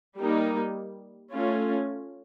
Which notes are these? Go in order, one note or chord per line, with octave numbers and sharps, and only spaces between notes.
G3 A#3 D#4
A3 C#4 F4